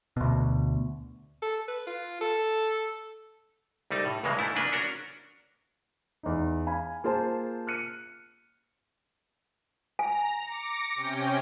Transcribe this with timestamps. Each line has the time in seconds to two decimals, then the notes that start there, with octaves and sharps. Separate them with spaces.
0.17 D2 B2
1.42 A4
1.68 B4
1.87 F4
2.21 A4
3.91 C2 G3 A3 D#4
4.05 A2
4.23 C#2 G2 C#3 E3 G#3 A#3
4.39 G#2 A3 E4
4.55 C#3 A#3 D4 B4
4.72 C#4 D4 F#4 A#4
6.23 E2 D#4
6.67 F5 G#5 B5
7.04 A#3 F4 G#4 C5 A5
7.67 F6 F#6 C#7 D#7
9.99 G#5 A#5
10.41 D6 A#6 C#7
10.95 C3 C#4 G5